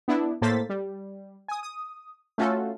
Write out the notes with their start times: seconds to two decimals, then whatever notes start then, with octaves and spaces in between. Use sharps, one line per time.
0.08 B3 D4 E4
0.42 A2 A#3 A4 C5 A6 B6
0.69 G3
1.48 G#5 D#6
1.63 D#6
2.38 A3 C#4 F4 F#4 A4